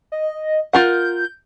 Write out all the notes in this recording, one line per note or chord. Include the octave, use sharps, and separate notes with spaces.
D#5
F4 A#4 F#5 G6